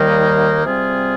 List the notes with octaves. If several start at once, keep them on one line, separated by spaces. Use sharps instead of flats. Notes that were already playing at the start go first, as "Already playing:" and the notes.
Already playing: D#2 D#3 G3 A#3 D#4
C3 G3 C4 F4 G#4